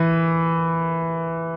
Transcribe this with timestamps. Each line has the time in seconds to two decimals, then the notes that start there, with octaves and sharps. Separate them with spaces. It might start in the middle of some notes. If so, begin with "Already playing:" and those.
Already playing: E3